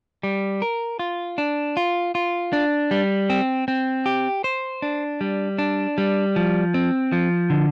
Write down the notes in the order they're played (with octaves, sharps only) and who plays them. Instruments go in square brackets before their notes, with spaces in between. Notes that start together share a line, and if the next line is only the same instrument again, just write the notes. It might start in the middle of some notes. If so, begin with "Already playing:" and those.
[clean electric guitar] G3
A#4
F4
D4
F4
F4
D4
G3
C4
C4
G4
C5
D4
G3
D4
G3
F3
C4
F3
D3